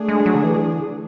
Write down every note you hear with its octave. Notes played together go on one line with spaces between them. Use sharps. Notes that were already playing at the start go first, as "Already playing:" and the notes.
Already playing: A3 D4 G#4
G#3
F#3
D3
E3